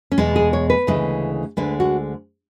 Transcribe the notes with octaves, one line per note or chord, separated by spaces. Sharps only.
C#4
E2 B2 G#3 B3
G#4
C#5
B4
D2 C#3 E3 G#3
D2 D3 G#3 B4
F#4